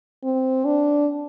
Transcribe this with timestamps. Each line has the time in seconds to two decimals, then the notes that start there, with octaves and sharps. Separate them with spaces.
0.24 C4
0.65 D4